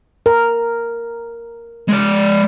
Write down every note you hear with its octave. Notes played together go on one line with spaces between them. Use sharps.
A#4
G#3 D5